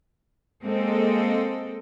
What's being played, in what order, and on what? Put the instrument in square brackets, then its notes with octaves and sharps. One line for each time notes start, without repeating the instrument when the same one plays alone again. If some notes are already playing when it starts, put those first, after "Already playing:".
[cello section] G#3 A#3 C4 A4 D#5